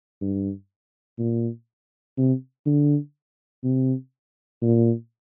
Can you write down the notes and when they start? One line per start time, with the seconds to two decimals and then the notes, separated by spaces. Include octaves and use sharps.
0.21 G2
1.18 A#2
2.17 C3
2.66 D3
3.64 C3
4.62 A#2